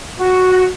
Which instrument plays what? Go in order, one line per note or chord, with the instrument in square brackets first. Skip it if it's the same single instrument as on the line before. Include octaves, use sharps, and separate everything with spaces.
[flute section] F#4